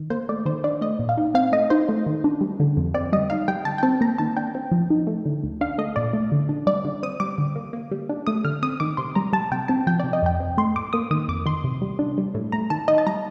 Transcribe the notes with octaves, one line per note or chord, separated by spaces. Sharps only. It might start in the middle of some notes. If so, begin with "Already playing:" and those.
Already playing: D#3
A#3 C5
A3 D5
D#3 C5
D4 D5
A3 D#5
A#2
F5
D#4
C4 F5
A3 D#5
D#4 C5
A3
D#3
D4
G3
D3
F2
C4 D5
G3 D#5
D#4 F5
G3 G5
D3 A5
G5
C4 A5
A#3 A#5
D#3 A5
D4 G5
C4
F3
D#4
A3
D3
D2
D4 F5
A3 D#5
A#2 D5
A3
D3
D4
G3 D5
D3
C4 D#6
G3 D6
D3
A#3
A#3
G3
D4
A3 D#6
D3 F6
C4 D#6
D#3 D6
C3 C6
G3 A#5
G3 A5
C3 G5
C4 A5
F3 G5
D5
C3
D#5
F2 G5
C4
A3 C6
A2 D6
A#3 D#6
D#3 D#6
F2 D6
D#3 C6
C3
G3
D4
G3
A2
A3 A#5
D#3 A5
D#4 D#5
A5
G3 A#5